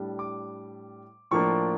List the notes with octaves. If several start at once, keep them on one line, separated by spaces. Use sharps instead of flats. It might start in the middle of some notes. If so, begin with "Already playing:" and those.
Already playing: A2 G3 D4
D6
A2 F3 A#3 D4 C#6